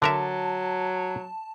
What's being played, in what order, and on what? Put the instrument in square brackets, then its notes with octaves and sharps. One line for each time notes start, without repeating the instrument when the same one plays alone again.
[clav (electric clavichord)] D3 A#4 E5 [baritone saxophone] F#3 [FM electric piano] A5